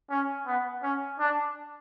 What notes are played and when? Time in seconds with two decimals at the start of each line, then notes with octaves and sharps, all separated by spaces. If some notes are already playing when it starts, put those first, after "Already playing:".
0.10 C#4
0.47 B3
0.83 C#4
1.19 D4